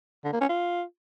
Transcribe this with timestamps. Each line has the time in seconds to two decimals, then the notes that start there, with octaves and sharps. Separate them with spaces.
0.25 D3
0.33 A#3
0.41 C#4
0.49 F4